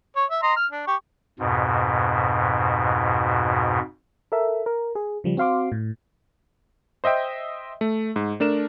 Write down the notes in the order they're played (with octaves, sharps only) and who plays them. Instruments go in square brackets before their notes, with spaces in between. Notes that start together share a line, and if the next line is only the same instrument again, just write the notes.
[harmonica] C#5
E5
D#5 A#5 C6
F6
D4
G4 C#6
[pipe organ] F2 G#2 B2
[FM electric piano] A4 A#4 E5
A#4
G#4
C#3 F3 G3
C4 F#4 F5 C6 D6
A2
[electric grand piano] C5 D#5 E5 G5
A3
G#2
A3 D4 A#4 E7